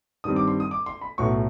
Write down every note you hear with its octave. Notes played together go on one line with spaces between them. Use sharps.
G2 D#3 G3 C4 D#6
D6
C6
D#6
D6
C6
B5
B1 A2 F#3 B3 C#6